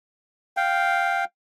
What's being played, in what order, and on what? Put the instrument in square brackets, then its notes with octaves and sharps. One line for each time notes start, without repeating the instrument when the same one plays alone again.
[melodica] F5 G5